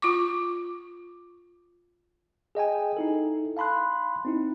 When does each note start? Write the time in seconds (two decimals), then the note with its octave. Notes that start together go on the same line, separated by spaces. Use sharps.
0.02 F4 C#6 D6
2.55 G#4 D#5 G5 G#5
2.97 D#4 E4 A4
3.57 F5 A5 B5 C6 F#6
4.25 C4 D#4 E4